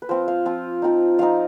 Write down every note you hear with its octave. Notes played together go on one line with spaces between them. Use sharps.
B4
F3 C4 F4 C5
F5
F3 C4 F4
F3 C4 D#4
F3 C4 D#4 F5